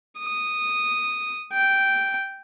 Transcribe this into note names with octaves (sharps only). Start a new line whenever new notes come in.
D#6
G5